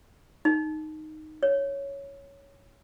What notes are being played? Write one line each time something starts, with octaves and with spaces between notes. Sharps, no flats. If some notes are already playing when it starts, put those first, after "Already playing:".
D#4
C#5